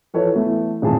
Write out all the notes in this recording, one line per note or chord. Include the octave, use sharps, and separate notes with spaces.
E3 F3 A4 B4 C#5
E3 A3 B3
D#1 G#1 F2 A2 G#4 A5